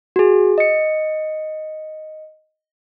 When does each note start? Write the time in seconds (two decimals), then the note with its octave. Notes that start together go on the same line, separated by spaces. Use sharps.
0.16 F#4 G#4
0.58 D#5 C#7